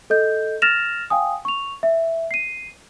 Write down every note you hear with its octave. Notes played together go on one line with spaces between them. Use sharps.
A4 D#5 G6
F6 A6 A#6 E7 F7
F5 G5 G#5 D#6
C#6 F7
E5
C7 D#7